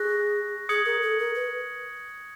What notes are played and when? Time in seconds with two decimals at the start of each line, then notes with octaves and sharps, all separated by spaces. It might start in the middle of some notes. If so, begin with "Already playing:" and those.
Already playing: G#4 C#6 F#6 A#6
0.69 G#4 D#6 G#6 C#7 F#7
0.85 A#4
1.02 A4
1.19 A#4
1.35 B4